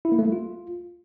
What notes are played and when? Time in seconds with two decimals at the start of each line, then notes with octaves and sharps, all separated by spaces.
0.05 E4
0.12 A#3
0.19 A3
0.26 G3
0.32 F4